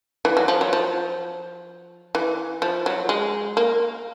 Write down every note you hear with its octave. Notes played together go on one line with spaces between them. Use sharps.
E3
F#3
F3
F#3
F3
E3
F3
F#3
G#3
A#3